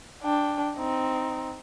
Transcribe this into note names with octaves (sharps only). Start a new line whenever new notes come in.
D4 G5
C4 D#4